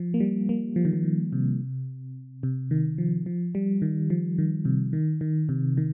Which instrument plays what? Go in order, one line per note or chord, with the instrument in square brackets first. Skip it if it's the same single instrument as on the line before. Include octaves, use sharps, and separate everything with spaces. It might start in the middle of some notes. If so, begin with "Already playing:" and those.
Already playing: [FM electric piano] F3
A#3
G3
A#3
F3
D#3
F3
D#3
C3
C3
D#3
F3
F3
G3
D#3
F3
D#3
C3
D#3
D#3
C3
D#3